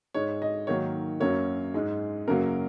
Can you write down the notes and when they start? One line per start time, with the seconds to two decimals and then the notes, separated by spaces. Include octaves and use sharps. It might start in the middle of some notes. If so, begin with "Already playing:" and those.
0.14 G#2 G#3 C#5
0.42 D#5
0.67 G#2 D#3 F#3 A#3 C#5
1.20 F#2 F#3 A#3 C#5
1.74 G#2 G#3
2.28 F#2 C#3 F#3 A#3 A#4